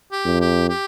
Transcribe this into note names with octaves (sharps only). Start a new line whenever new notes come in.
G4
F2
G4
G4